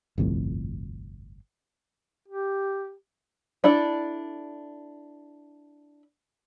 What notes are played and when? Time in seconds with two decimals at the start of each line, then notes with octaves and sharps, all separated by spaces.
0.18 G1 C2 F2 A2
2.28 G4
3.64 D4 E4 A4 D5